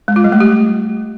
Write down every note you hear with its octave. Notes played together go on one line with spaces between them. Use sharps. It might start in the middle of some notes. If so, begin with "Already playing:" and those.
G#3
F4
G3
A3
G4